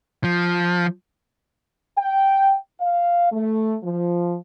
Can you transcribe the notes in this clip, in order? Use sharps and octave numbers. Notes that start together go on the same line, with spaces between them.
F3
G5
F5
A3
F3